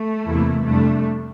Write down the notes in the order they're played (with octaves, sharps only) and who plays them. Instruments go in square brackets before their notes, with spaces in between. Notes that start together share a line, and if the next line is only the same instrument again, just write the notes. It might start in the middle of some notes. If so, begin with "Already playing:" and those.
Already playing: [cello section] A3
[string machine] E2 C3 E3 A#3 E4
[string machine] F2 C3 G3 D4 [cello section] A3